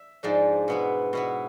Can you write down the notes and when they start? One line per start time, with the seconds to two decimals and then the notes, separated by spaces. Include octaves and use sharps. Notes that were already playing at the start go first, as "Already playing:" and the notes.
Already playing: E5
0.23 G#2 F3 G#3 D4
0.68 B2 B3 E4
1.13 B2 B3 E4